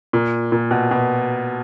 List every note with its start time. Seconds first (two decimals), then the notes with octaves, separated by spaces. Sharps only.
0.13 A#2
0.52 A#2
0.71 B2
0.91 B2